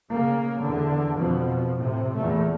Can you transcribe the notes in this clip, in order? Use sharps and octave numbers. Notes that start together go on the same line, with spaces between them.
C#3 A#3
E2 D3
F2 B2 F3
A2 C3
E2 A#2 A3